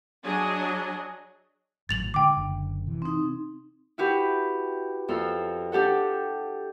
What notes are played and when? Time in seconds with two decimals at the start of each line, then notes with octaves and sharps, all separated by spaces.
0.23 F#3 D4 G#4 D#5 G#5
1.89 G#1 A2 F#3 A6 F7 F#7
2.14 D3 G#3 G5 D6
2.37 F#1 D3
2.87 C3 E3
3.02 C4 D#4
3.98 E4 F#4 G4 B4
5.08 F2 A4 F5 E6
5.72 D4 G4 A4 F#5